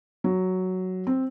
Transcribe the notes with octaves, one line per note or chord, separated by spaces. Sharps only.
F#3
C4